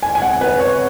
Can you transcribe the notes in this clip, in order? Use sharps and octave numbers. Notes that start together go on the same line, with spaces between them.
G#5
G#5
F#5
B4
C#5